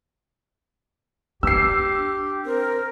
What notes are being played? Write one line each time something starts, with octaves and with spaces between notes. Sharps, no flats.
D4 G4 E6 C7
C4 A#4